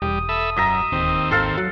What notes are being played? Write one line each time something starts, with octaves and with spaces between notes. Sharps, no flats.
E1 G3 D#6
A4 E5 B5
F#2 D#5 E5 A#5
D1 D#2 C4
G#1 A4 F5 C6
F#3 F#5